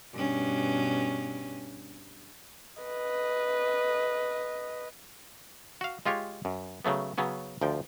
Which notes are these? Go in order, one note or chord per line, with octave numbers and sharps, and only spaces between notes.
G2 B2 C#4
B4 D#5
F#4 F5
G#3 F4 G4 C#5
F#2
C#3 F#3 A3 B3
C#3 F#3 B3 C#4
D2 F3 G5